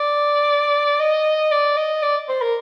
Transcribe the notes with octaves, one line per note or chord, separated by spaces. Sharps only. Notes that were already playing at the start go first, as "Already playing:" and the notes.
Already playing: D5
D#5
D5
D#5
D5
C5
A#4